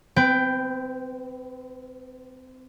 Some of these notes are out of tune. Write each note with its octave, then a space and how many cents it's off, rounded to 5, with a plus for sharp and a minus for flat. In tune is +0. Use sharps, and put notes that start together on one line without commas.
C4 -25 B4 +20 G5 +0